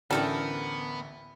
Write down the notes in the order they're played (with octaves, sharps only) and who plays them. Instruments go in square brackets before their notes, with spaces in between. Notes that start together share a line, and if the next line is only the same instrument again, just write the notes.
[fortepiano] A1 D2 E3 [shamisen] G3 [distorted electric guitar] B3 [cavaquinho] A4 A#4 C5